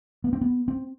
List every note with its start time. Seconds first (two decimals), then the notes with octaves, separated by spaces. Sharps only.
0.24 B3
0.33 C4
0.41 B3
0.68 C4